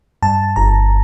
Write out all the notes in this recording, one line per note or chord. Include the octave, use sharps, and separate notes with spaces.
G2 A5
G1 A#5